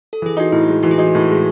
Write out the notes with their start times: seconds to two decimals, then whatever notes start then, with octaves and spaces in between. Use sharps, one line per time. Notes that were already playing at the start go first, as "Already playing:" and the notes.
0.13 A4
0.22 E3 G#4
0.37 D#4 F#4
0.52 A2 E4
0.68 G#3
0.83 E3 F#4
0.91 G#4
0.98 D#4 F#4
1.15 A2
1.30 G#3